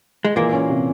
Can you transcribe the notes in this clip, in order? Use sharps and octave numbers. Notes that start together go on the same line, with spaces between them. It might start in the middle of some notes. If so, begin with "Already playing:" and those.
G#3
A#2 E3 A#3
C#4
C3